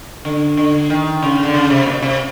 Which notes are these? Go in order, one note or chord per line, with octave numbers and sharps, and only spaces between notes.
D3
D3
D#3
C#3
D3
C#3
C3
A#2
C3